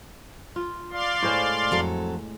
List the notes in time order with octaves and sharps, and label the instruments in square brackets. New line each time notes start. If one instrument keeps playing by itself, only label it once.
[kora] F4
[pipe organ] D5 F5 C6
[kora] A2 G#3 C5
[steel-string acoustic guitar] F2 F#3 A4